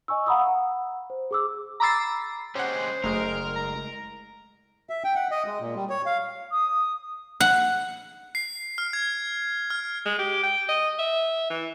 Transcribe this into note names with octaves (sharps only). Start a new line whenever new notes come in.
D#5 G#5 C#6 E6
F5 F#5 A#5 B5 D#6 E6
F#5 A#5
C5
G#4 D6 E6
A#5 B5 D6 E6 A6 C7
G#3 C#4 G4 C5 F#5
F#1 G#3 A3 A#4
A#5
E5
G5
F#5
D#5
G#3
A#2
G3
C#5
F5
D#6
F#5
C7
F6
G#6
F6
G#3
G4
G5
D#5
E5
E3